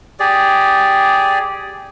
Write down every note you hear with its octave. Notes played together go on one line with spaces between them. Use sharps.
G4 G#4 D5